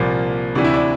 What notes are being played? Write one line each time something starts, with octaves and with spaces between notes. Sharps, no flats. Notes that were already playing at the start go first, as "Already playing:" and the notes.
Already playing: C2 A#2 F3 A#3
D2 C3 E3 D4
E4
D4